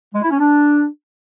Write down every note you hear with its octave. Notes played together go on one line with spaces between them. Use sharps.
G#3
E4
C#4
D4